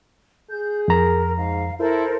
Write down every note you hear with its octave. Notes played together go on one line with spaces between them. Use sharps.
G#4 G6
F2 A#4 A#5
G#2 F5
E4 A4 A#4 C5